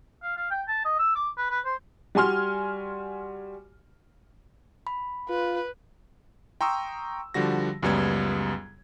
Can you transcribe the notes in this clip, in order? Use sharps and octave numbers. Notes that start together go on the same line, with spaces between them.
F5
F5
G5
A5
D#5
E6
D6
B4
B4
C5
G3 F#4 G#5 C6 F6
B5
F4 B4
G5 A#5 C6 C#6 D#6 E6
D3 F3 G3 F#4 A#6
C#2 F#2 G3 B3 G#6